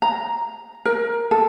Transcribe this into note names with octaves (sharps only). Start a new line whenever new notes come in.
A#5
A#4
A4